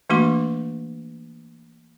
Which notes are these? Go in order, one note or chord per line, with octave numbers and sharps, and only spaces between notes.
E3 A3 A#3 D4 F#4 C6